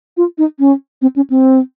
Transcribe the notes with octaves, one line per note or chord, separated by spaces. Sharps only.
F4
D#4
C#4
C4
C#4
C4